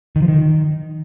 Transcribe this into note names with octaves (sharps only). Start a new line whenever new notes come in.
D#3
F3
D#3